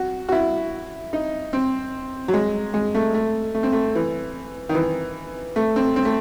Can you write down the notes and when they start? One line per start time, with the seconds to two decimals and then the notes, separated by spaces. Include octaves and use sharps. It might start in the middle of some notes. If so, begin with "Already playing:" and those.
Already playing: F#4
0.29 F#4
0.32 E4
1.13 D#4
1.53 C4
2.28 F#3
2.33 G#3
2.74 G#3
2.95 A3
3.14 A3
3.55 A3
3.63 C4
3.72 A3
3.95 E3
4.69 D#3
4.75 E3
5.56 A3
5.76 C4
5.96 C4
6.05 A3